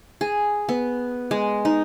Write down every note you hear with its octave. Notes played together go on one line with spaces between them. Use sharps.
G#4
B3
G#3
D#4